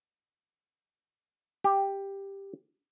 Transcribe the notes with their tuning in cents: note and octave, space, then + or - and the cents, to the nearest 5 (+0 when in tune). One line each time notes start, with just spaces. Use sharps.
G4 +5